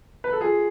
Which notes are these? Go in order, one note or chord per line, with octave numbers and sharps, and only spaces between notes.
B4
A4
F4 G#4